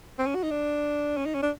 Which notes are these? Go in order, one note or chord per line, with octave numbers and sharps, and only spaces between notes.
C4
C#4
F#4
D#4
D4
C#4
D#4
C#4
D4